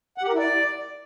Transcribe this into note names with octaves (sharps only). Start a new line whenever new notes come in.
F#5
G4
A#4
E4
D5